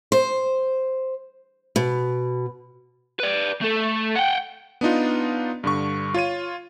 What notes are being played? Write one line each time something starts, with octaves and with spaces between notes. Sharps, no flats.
C5
B2
B4 D5
A3 A4
F#5 G5
B3 D4 D#4 F4
G2 D3 C#6
F4 C#5 D#7